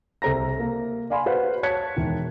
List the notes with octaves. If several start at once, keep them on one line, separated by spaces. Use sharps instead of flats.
C2 A4 C5 A#5 A#6
A#3
D5 F5 G#5 B5 C6
F#4 B4 C5 F5 F#5
C#5 A5 F#6 G#6 B6 C#7
E1 D#3 E3